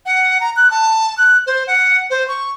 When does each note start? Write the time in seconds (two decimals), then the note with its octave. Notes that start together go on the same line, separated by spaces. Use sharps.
0.06 F#5
0.40 A#5
0.56 F#6
0.71 A5
1.18 F#6
1.47 C5
1.67 F#5
2.10 C5
2.28 C#6